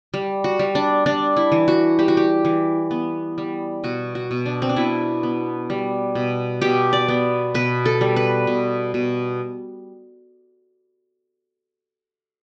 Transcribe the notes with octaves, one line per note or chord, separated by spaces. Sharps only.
G3
F#4
G3
D4
G3 D4
E4
E3
F#4
G3 G4
F#4
G4
E3
B3
G3
B2 F#4
F#4
B2
D4
C4
D4
B2 E4
B3
G3
B2
B2 G4
D5
B3
B2 B4
A4
G3
B4
B2
B2